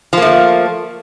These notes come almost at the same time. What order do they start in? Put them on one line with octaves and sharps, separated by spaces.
F3 A#3 A3